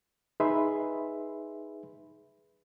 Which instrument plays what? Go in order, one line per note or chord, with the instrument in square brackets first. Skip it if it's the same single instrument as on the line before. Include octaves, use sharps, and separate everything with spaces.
[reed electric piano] D#4 G#4 B4 E5 B5 C6